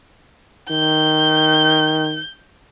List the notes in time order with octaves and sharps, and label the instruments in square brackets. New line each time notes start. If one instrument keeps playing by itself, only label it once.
[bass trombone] D#3 [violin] G6